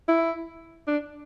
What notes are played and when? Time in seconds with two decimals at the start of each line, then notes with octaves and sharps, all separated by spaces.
0.08 E4
0.88 D4